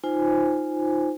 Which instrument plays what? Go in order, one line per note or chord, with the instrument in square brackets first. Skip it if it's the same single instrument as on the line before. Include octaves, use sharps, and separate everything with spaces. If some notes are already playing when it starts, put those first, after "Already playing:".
[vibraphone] D#4 F4 C5 G#5